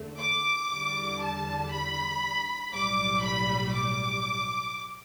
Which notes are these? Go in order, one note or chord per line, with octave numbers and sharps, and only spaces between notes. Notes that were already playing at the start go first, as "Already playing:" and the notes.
Already playing: E2 D3 A3
D6
E2 D3 G3
A5
B5
B1 A2 G3 D6
B5
D6